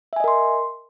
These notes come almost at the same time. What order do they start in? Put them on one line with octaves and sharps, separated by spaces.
E5 G#5 D#5 A#4 C6